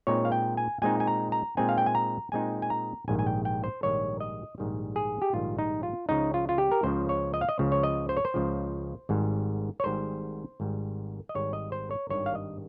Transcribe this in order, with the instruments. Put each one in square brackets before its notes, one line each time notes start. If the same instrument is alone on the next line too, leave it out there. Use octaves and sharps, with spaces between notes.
[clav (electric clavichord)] A#2 G#3 C4 D#4 C#5
F5
G5
G#5
A#2 G#3 C4 D#4 G#5
G#5
A#5
A#5
A#2 G#3 C4 D#4 G#5
F5
G5
G#5
A#5
A#2 G#3 C4 D#4 G#5
G#5
A#5
A#1 G#2 D#3 G3 G#5
G#5
G5
G5
C5
A#1 G#2 D#3 G3 C#5
D#5
A#1 G#2 D#3 G3
G#4
G4
A#1 G#2 D#3 G3 F4
D#4
F4
C#2 C#3 F3 D#4
F4
F4
G4
A#4
C#2 C#3 F3 C5
C#5
D#5
F5
D#5
C#2 C#3 F3
C#5
D#5
C5
C#5
C5
C#2 C#3 F3
G#1 G#2 G3
C#5
G#1 G#2 G3 C5
G#1 G#2 G3
D#5
G#1 G#2 G3 C#5
D#5
C5
C#5
G#1 G2 D#3 G3 C#5
F5
D#5